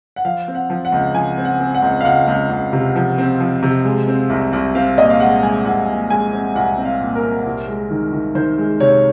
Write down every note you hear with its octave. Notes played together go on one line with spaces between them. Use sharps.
F#5
F3 F5
C4
F#5
F3
F#5
C#2
F3 G#5
C4
F#5
C4
F#5
C#2
F5
C#2 F#5
C#2
C#2
C3
F3
C4
F3
C3
G#3
C4
C2
C2
C4 F5
A#2 D#5
F5
G#3 F#5
G#3 G#5
C2 F#5
A#2
G#3 G#5
C4
C2 F#5
C4
F5
A#2
A#4
C4
C2
G#3
D#3
D#3
D#3 C5
G#3
C3 C#5